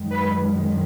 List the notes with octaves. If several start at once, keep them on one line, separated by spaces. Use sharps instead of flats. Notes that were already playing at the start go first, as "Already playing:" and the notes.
Already playing: F#2 D#3 G#3
B4